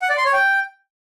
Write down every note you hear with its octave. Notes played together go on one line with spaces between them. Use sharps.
F#5
D5
C6
C#5
G5